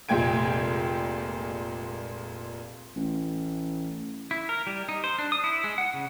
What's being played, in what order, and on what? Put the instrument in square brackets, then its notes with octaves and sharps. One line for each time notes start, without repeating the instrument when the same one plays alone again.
[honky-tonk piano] F1 A#2 G#3 G5 G#6 D7
[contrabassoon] A1
[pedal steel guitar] E4
A#4
G3
D#4
C5
D4
D#6
E4
G#3
F#5
C#3